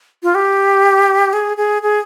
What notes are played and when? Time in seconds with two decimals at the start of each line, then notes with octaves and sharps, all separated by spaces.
0.23 F4
0.35 G4
1.33 G#4
1.57 G#4
1.82 G#4